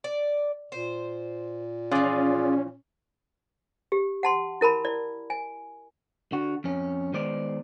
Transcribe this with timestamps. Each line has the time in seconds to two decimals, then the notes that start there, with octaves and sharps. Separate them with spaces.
0.04 D5
0.72 A#2 C5
1.91 E3 F3 C#4 F4 G#4 D5
3.92 G4
4.23 F#5 A5 C6
4.61 E4 A#4 A5 B5
4.84 E4 D5
5.30 G#5
6.32 D3 F#4
6.64 F2 C#4
7.13 D#3 G#3 B3 C5 D5